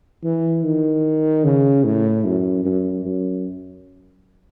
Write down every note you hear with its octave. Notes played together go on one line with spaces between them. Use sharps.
E3
D#3
C#3
A2
F#2
F#2
F#2